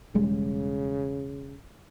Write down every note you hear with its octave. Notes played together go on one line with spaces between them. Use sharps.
E1 C#3 G3 G#3